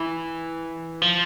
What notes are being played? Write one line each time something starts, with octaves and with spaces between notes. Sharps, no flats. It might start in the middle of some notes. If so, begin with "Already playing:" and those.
Already playing: E3
F3